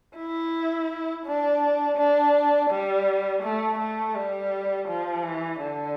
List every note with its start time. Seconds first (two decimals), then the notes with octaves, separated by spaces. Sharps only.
0.17 E4
1.26 D4
1.97 D4
2.70 G3
3.43 A3
3.79 A3
4.15 G3
4.88 F3
5.24 E3
5.60 D3